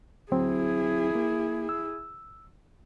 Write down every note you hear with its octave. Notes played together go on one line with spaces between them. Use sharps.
D2 F#3 C4 E4 G#4
A#3
E6